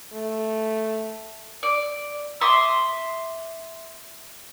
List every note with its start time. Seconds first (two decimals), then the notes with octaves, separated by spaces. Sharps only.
0.13 A3
1.63 D5
2.41 E5 C6 D6 D#6